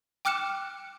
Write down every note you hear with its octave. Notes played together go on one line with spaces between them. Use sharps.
G5 D6 F6 F#6 C#7 E7